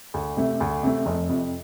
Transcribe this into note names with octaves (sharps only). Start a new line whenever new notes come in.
D2
C3 A3
D2
C3 A3
F1
F2 C3